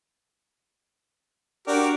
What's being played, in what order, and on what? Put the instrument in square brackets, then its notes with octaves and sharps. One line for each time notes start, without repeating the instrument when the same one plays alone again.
[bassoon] D4 [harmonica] F#4 G4 A#4